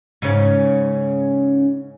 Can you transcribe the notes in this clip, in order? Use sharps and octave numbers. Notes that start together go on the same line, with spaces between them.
G#2 C#3 C#4